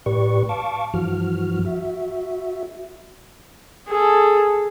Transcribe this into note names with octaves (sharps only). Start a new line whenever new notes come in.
A2 G4 B4 D5 C#6
F5 A5 C#6 D6
G2 E3 F3 F#4 F6
F#4 E5
G#4 A4